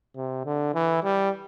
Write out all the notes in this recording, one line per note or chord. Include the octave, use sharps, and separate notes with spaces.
C3
D3
E3
G3